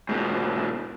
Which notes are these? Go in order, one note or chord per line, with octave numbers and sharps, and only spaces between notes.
G#2 B2